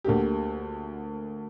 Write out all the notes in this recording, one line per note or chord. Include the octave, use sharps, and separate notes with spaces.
D2 D3 A#3 G4